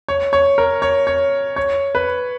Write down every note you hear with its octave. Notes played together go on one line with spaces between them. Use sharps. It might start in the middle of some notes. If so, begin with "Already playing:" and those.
C#5
C#5
A#4
C#5
C#5
C#5
B4